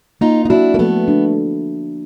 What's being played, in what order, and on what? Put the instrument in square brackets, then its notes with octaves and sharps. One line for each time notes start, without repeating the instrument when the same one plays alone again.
[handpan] A#3 [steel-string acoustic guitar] D#4 F4
[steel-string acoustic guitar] D#4
[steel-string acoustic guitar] D4 E4 [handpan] F#4
[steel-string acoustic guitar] A#3
[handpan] F3 [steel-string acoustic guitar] A3 B3
[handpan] D4